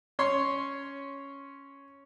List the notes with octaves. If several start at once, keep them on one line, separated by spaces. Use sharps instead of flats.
C#4 C#5 C6